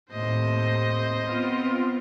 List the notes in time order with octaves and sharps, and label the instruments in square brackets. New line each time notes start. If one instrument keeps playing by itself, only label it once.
[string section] D#2 A2 C3 [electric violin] C5 D#5
[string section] B3 C4 F4